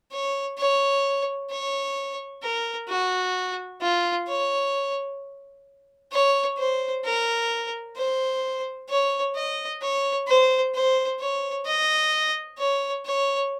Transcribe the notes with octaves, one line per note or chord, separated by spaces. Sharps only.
C#5
C#5
C#5
A#4
F#4
F4
C#5
C#5
C5
A#4
C5
C#5
D#5
C#5
C5
C5
C#5
D#5
C#5
C#5